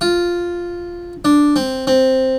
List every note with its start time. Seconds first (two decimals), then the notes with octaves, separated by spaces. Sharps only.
0.01 F4
1.25 D4
1.56 C4
1.87 C4